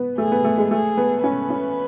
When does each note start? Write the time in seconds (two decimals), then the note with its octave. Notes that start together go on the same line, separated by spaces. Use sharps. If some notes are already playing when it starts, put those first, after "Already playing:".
Already playing: B3
0.18 A3 G#4
0.32 B3
0.44 A3
0.58 G#3
0.71 A3 G#4
0.97 B3
1.24 C#4 B4
1.50 C#4